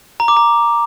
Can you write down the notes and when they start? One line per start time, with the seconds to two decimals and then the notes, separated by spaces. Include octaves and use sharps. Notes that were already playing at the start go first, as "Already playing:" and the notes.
0.20 A#5
0.28 D6
0.37 A#5